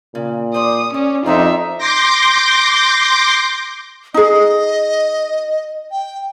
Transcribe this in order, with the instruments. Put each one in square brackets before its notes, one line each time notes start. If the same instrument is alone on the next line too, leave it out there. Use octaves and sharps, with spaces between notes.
[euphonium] A#2 [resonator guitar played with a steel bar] C#3
[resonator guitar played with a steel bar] C5 D5 [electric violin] D#6
[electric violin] C#4 [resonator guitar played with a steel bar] D5
[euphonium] F2 [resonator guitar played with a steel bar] C4 D4 A#4 [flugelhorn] D#4 [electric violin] F4 E5
[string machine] C6 D6 G6 A#6
[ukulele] D#4 G#4 [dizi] D#5
[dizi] G5